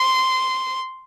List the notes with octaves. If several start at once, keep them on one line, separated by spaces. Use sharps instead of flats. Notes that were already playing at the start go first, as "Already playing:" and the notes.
Already playing: C6